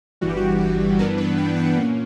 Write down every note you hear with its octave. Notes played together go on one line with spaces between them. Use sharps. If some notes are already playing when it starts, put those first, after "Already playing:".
G1 G2 E3 G3 F#4
G4
F#4
G4
G2 E3 B3 D4 A#4
B4
G5
F#5
A#2 A#3 C#4